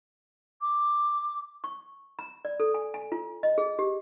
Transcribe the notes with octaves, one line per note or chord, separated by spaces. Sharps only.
D6
C#6
B5
D5
A4
G#5
G#5
F4
D#5
G#4
G4